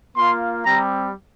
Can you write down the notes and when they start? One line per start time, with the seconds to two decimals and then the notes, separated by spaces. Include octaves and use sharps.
0.16 A#3 F4 C6
0.65 G3 C4 G4 A#5